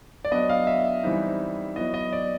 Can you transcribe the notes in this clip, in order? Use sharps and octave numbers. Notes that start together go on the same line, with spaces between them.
D5
F#3 B3 D4 D#5
F5
E5
E3 G3 C4 D#4
F#3 B3 E4 D#5
D#5
D5